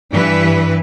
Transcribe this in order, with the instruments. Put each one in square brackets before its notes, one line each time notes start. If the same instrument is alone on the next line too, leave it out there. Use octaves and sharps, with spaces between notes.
[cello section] G2 E3 B4